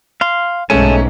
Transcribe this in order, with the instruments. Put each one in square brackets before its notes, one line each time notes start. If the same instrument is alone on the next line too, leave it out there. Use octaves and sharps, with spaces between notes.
[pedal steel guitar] F5 C6
[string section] B1 G#2 [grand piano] G#3 A3 C#4 [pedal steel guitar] G#5 A5